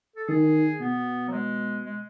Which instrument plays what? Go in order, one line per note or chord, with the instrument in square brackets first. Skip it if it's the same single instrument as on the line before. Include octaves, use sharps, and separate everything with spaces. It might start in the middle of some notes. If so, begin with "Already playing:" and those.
[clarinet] A4
[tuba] D#3 [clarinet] G#4
[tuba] B2 [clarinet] B3
[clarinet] F#3
G#3
G#3